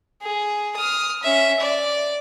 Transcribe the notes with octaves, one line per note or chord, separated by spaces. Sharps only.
G#4
D#6 F6
C#4 E5
D5